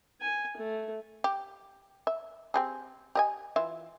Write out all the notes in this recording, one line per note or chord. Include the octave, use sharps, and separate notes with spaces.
G#5
A3
G4
E5
C4 G4 G#4
G4 D#5 G#5
E3 F4 E5